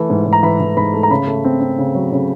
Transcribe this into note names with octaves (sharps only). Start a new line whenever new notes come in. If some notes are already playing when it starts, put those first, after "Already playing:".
Already playing: E3 A3
G#2
G#2
A#5
E3 B5
E3
G#2 B5
A3
A#5
C#3 B5
A3
C4
C4
C#3
F#3
C#3